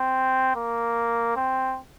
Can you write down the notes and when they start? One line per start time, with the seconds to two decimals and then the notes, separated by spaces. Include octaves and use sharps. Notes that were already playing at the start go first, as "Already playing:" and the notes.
Already playing: C4
0.56 A#3
1.36 C4